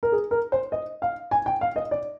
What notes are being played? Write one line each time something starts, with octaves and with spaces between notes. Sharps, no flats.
A#4
G#4
A#4
C5
D#5
F5
G#5
G5
F5
D#5
D5